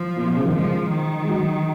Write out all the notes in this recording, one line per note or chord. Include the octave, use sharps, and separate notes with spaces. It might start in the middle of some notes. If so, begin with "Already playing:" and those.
Already playing: F3
A#2
B2
C#3
D#3
F3 G#3
D#3
G#3
F#3